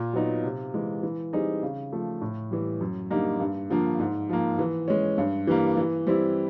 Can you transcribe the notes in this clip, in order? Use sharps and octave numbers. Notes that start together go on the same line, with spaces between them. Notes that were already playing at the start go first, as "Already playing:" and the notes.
Already playing: A#2
F#3 B3 D#4
C3
E3 G#3
E3
G3 C4 D#4 G#4
C#3
F3 A3
A2
E3 G3
F#2
D3 G3 A#3 D#4
G2
D3 F3 A#3
G#2
F3 A#3
E3
G#3 C#4
G2
E3 G3 A#3
E3
G3 C4 E4